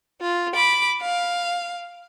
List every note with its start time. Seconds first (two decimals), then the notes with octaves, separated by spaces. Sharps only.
0.22 F4
0.54 B5 D6
1.02 F5